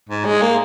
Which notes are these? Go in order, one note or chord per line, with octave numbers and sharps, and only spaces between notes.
G#2
G#3
A#3